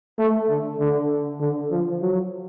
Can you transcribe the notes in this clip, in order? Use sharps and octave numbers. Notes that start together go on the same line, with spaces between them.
A3
D3
D3
D3
F3
F#3